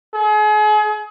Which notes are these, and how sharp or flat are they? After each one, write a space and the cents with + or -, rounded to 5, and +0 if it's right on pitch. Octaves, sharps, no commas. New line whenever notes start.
G#4 +35